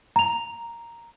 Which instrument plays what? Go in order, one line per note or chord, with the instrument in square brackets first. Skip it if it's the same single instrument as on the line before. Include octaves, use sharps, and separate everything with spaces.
[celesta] A#5 F7